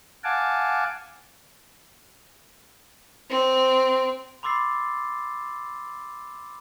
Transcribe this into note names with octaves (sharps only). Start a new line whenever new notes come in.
F5 F#5 G#5 A5 D6
C4
B5 C6 D6 E6 A6 C7